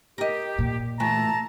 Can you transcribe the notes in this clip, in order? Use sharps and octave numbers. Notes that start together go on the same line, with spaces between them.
G4 A#4 D#5
A#2
E3 A3 A5 A#5